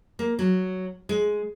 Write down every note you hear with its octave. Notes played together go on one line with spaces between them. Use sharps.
A#3
F#3
G#3